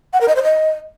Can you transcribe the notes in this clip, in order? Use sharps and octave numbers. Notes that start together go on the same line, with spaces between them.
F#5
A#4
D#5
C5
D#5